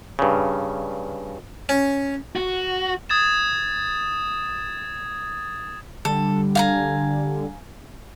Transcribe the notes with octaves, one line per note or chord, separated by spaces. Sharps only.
G2 C#3
C#4
F#4
D#6 G#6 A6 E7
D3 G3 A4
F5 G#5 A#5